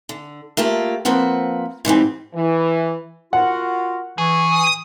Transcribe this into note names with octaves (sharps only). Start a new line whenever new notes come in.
D3
A3 A#3 F4 G4
F3 A#3 C4 B4 F#5
G#2 E3 G3 C4
E3
F4 F#4 A#4 F#5
E3 G#4 C#6
D#6